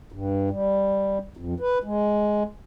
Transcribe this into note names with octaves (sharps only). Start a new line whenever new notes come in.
G2
G3
F2
B4
G#3